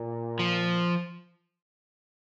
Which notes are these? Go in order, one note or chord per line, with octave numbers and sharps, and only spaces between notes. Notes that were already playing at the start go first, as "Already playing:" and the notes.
Already playing: A#2
F3